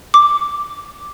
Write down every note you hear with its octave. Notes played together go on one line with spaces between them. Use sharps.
D6